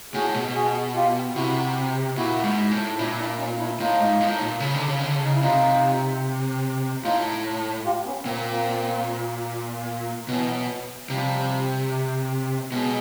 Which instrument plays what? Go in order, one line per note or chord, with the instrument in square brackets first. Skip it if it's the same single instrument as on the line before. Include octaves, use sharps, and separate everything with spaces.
[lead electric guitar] A2 [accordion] F#4 G#4
[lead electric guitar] B2
[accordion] F#4 G#4
F4 G4
[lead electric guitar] C3 [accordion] E4 F#4
[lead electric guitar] A#2 [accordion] E4 F#4
[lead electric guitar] G#2
A2
[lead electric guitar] A#2 [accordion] D4 E4
[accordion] D4 E4
C#4 D#4
D4 E4
[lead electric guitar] A2 [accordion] D#4 F4
[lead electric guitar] G#2
A2
A#2
C#3
D3
C#3
D3
C#3
[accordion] D#4
E4
[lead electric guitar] C3 [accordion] D#4 F4
[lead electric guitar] A2 [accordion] D#4 F4
[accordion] F4 G4
B3 C#4
[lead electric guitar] A#2 [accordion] A#3 C4
[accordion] A#3 C4
[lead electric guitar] B2 [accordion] E3 F#3
[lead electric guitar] C3 [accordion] F3 G3
[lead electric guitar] B2 [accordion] F#3 G#3